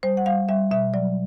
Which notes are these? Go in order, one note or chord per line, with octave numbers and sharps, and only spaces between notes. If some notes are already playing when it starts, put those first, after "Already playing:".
G3 C5
F#5
G3 F5
G3 E5
B2 E5
F#3 D5